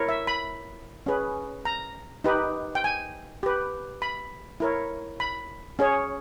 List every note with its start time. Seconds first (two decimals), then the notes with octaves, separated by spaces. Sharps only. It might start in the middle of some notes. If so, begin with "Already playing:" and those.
Already playing: E4 A#4 C#5
0.09 E5
0.27 B5
1.06 C#4 G#4 B4
1.65 A#5
2.24 D#4 G4 B4
2.75 G5
2.84 G#5
3.43 G4 B4
4.02 B5
4.60 E4 A#4 C#5
5.20 B5
5.79 C#4 G#4 C#5